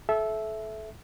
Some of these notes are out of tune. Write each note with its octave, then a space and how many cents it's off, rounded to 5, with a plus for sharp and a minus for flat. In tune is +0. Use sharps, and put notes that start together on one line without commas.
A4 -30 E5 +0